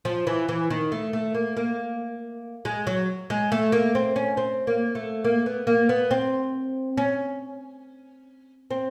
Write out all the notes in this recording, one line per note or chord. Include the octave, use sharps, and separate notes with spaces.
F3
E3
E3
D#3
A3
A3
A#3
A#3
G#3
F#3
G#3
A3
A#3
C4
C#4
C4
A#3
A3
A#3
B3
A#3
B3
C4
C#4
C4